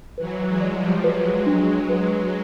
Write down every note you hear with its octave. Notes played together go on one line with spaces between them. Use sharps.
E3 F#3 B4
F#3 G#3
D5
F3 G3
F#3 G#3 B4
D4
B4